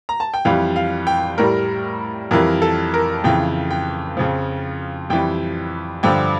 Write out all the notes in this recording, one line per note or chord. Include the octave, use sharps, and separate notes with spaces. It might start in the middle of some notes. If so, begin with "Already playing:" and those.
A#5
A5
G5
F2 E3 G3 F5
F5
G5
A2 G3 A#4
F2 E3 G3 A#4
A4
A#4
F2 C#3 E3 G5
G5
F2 C#3 F3
F2 E3 G3 G5
G2 D3 F3 G5